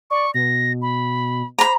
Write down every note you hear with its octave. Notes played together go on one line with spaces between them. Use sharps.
D5 C#6
B2 A#6
B5
C5 A#5 B5